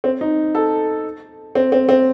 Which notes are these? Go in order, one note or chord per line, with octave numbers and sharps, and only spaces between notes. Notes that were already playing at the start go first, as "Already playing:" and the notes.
C4
D#4
A4
C4
C4
C4